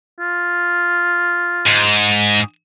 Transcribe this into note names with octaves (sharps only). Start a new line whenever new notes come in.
F4
G#2